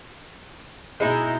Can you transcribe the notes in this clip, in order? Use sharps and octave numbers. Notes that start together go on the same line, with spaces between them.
B2 G#3 D#4 E4 A#5 G6